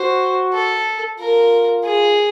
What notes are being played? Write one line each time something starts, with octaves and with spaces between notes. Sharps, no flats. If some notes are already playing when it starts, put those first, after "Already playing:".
Already playing: F#4 C5
A4
F4 A#4
G#4